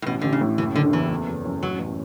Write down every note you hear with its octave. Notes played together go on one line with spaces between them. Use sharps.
A2
A1 B2
A1 D3
C#3
A2
F#1 E3
F#1 D3
E2 E3
A3
F#1
F#2
A1 F#3
A1